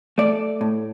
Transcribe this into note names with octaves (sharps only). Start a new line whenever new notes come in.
A3 D5
A2